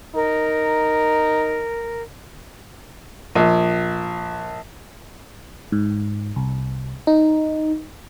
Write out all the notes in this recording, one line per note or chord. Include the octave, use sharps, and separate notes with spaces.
D#4 A#4
A#1
G#2
C2
D#4